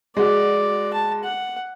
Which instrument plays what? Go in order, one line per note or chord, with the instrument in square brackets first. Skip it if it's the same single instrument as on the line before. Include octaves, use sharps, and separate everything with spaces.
[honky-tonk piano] G#3 F#4 [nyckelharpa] D5
[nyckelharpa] A5
F#5